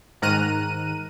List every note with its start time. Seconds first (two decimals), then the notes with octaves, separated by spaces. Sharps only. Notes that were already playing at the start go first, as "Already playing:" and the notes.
0.22 G#2 D#3 A#5 F6 F#6 D#7